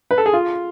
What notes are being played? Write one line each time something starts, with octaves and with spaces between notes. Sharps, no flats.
B4
A4
G#4
F4